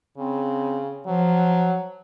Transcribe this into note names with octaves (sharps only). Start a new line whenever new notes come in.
C#3 C4
F3 F#3